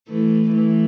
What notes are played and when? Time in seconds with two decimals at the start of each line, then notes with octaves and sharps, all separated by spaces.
0.09 E3 A3
0.54 E3 A3